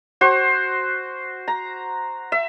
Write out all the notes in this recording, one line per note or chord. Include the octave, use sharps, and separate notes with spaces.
F#4 C5
A#5
E5